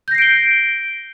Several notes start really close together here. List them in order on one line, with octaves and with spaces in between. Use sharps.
G6 A#6 C7 D7 G7